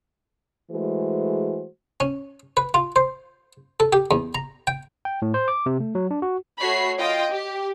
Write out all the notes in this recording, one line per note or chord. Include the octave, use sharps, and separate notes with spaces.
E3 G#3 A3 F#4 G#4 C5
C#4
B4
F4
C5
A4
G4
E2
A#5
G5
G5
A2
C5
D6
C3
A3
F#3
D4
F#4
A3 F#4 C#5 B5 C7
F4 D#5 G5
G4